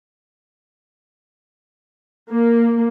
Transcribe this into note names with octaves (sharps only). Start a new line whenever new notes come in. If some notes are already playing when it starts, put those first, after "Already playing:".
A#3